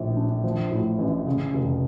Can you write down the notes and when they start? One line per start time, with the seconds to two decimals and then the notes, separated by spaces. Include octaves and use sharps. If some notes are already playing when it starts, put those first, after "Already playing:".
Already playing: A#1 A2
0.17 D4
0.44 F3
0.71 A2
0.99 A1
1.27 C#3
1.54 F1